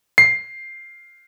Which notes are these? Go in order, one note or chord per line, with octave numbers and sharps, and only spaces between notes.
C7